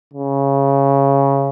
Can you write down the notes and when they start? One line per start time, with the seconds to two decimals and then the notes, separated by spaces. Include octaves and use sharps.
0.13 C#3